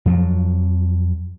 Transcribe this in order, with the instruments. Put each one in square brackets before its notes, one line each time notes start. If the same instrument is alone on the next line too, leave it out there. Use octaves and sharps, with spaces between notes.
[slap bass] F2 F3 F#3